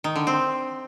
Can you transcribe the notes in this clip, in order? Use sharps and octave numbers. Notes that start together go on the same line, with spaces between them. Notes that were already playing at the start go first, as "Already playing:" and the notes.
D#3
D3
C4